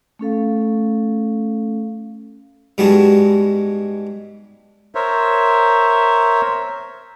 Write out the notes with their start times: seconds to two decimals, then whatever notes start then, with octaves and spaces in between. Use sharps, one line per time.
0.19 A3 C#4 A4 F5
2.78 G#2 G3 G#3 B3 F#4 A5
4.95 A#4 C5 C#5 E5